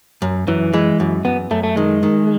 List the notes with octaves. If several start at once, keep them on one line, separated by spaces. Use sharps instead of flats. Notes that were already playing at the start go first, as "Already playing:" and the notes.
F#2
F#2 E3
E3 G#3
F#2
F#2 B3
F#2 A3
A3
D#3 G#3
D#3